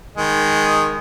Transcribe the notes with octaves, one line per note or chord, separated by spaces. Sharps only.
D#3 G#3